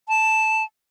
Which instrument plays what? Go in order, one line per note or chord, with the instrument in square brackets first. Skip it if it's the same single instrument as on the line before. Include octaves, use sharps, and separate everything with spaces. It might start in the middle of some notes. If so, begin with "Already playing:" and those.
[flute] A5